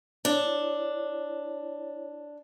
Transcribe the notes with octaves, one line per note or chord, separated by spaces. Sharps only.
D4 E4 C#5